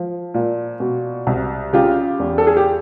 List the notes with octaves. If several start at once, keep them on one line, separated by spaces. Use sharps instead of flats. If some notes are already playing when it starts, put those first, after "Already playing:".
Already playing: F3
A#2
B2
C2
C#3 F4 G4
E2
A4
G#4
G4